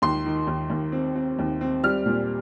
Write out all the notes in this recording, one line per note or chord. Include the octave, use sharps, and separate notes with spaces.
D#2 C6
D#3
D#2
D#2
C4
C4
D#2
C4
G3 F6
A#2